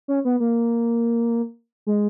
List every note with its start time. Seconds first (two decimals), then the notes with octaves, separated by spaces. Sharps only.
0.08 C#4
0.25 B3
0.40 A#3
1.86 G#3